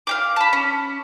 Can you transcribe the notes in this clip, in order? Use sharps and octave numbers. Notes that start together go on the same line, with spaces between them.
F5 G5 D6
A5 B5
C#4